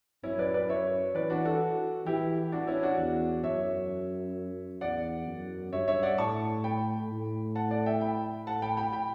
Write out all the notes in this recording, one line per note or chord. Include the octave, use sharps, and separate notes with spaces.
F#2 C#4 E4
B4 D5
B4 D5
C#5 E5
E3 B4 D5
D4 F#4
F#4 A4
E3 E4 G4
D4 F#4
C#4 E4
D4 F#4
E2
F#2 C#5 E5
E2 D5 F#5
F#2
G2 C#5 E5
C#5 E5
D5 F#5
A2 A5 C#6
G5 B5
A2
F#5 A5
D5 F#5
E5 G5
G5 B5
A2 F#5 A5
G5 B5
G5 B5
G5 B5